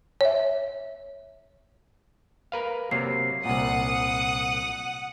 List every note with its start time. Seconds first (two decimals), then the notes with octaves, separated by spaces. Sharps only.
0.21 C#5 E5
2.52 A#4 B4 F5
2.91 C3 F#3 A#3 C7
3.45 C2 A#2 F#5 D#6